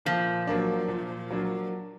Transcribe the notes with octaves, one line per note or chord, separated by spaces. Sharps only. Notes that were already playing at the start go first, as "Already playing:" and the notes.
A#2 F3
F#3 A#3 D4
A#2
F#3 A#3 D4